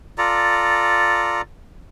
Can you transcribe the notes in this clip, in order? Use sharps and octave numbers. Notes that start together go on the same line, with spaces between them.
F4 A4 D5 A#5